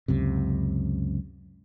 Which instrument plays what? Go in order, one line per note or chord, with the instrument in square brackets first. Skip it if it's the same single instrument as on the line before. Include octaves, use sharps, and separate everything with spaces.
[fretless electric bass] C#2 F#2 C3